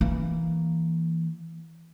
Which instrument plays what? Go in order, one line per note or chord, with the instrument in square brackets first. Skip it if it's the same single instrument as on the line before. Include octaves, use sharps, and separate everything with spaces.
[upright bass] E3 A#3